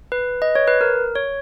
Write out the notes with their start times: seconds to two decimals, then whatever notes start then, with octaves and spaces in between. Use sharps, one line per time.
0.12 B4
0.42 D#5
0.55 C#5
0.67 B4
0.81 A#4
1.15 C#5